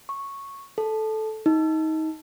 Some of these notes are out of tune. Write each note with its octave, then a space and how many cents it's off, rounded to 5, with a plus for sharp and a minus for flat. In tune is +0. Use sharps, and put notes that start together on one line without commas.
C#6 -5
A4 -10
D#4 +25